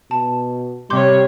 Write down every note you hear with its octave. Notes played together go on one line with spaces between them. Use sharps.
B2 A5
C3 G3 C#5 C6 D6 G6